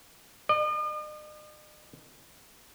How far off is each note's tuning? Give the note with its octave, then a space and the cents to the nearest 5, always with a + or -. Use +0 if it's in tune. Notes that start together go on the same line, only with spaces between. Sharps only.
D#5 -45